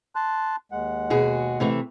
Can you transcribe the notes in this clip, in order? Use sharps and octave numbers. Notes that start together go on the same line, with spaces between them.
A5 C6 F#6
D#2 G#3 F#5
B2 F#4 G#4
C3 E3 A3